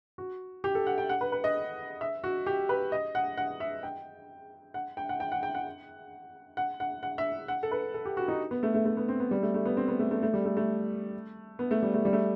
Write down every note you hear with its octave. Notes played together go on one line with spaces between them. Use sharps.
F#4
G4
A4
F#5
G5
F#5
B4
B4
D#5
E5
F#4
G4
B4
D#5
F#5
F#5
E5
G5
F#5
G5
F#5
G5
F#5
G5
F#5
F#5
F#5
F#5
E5
F#5
A4
B4
A4
G4
F#4
D#4
B3
A3
A3
A3
B3
C4
B3
G3
A3
A3
B3
C4
B3
A3
A3
A3
G3
A3
A3
B3
A3
G3
A3
G3
A3